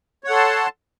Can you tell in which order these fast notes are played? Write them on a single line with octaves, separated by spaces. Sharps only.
C#5 F#5 A4 C6 A5